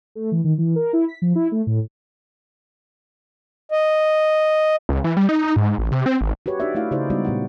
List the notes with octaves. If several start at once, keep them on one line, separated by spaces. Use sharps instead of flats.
A3
E3
D#3
E3
A#4
E4
B6
F3
E4
A3
A2
D#5
C#2
E3
G3
D#4
D#4
G#2
A1
C3
C4
G#1
F#4 G4 B4 C#5
D4 D#4 F#4 G4 D5 E5
A3 D#4 E4 F5
C#3 D#4 E4 G#4 C5 D5
G3 G#3 B3 D#4 F#4 D5
A#2 B3 G4 F#5